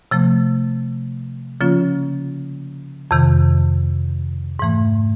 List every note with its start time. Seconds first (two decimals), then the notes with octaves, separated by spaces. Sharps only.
0.11 C3 F3 A3
1.61 C#3 F3 A#3 C#4 F4
3.11 F2 C3 D#3
4.59 G#2 E3 A3